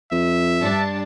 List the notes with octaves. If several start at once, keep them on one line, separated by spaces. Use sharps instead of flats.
F2 E5
G2 D4 A5